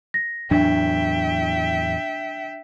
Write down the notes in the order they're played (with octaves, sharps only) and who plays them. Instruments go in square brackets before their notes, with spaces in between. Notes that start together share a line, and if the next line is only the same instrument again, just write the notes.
[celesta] A#6
[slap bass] E2 A2 F#3 [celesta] D4 [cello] E5 G5